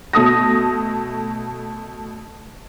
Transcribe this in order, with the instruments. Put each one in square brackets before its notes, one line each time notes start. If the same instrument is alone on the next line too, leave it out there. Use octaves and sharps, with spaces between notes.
[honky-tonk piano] B2 A3 D#6 A#6